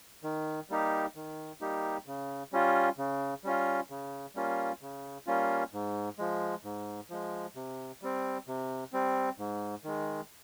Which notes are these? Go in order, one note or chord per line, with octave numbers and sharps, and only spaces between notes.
D#3
G3 A#3 D#4 G4
D#3
G3 A#3 D#4 G4
C#3
G3 C#4 F4
C#3
G3 C#4 F4
C#3
G3 A#3 C#4 F4
C#3
G3 A#3 C#4 F4
G#2
F3 G#3
G#2
F3 G#3
C3
G3 C4
C3
G3 C4
G#2
D#3 G#3